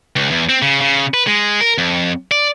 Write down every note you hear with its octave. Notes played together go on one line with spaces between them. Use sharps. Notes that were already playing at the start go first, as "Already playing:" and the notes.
C#2
E2
C4
C#3
C#3
B4
G#3
A#4
F2
D5